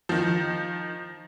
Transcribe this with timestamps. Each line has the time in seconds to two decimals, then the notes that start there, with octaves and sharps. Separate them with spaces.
0.09 D#3 F3